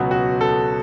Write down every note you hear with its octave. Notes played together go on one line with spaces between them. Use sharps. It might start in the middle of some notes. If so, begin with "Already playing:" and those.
Already playing: C#2 B2 F#3 B3 F#4
F#4
A4